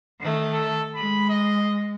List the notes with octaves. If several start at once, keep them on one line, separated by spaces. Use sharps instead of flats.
D#3 A3
A4
G#3 B5
D#5